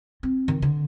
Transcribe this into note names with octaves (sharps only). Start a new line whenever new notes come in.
C4
D#3
D3